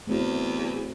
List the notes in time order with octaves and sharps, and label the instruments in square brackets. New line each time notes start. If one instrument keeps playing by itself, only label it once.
[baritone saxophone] E2 [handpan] A3 C4 F#4